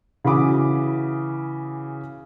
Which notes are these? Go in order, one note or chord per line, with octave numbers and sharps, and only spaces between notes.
C#3 E3 F#4 B5 D6 D#6